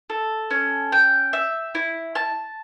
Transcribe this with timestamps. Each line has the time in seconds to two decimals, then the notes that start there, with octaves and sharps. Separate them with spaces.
0.10 A4
0.51 C#4
0.92 G5
1.33 E5
1.75 E4
2.15 A5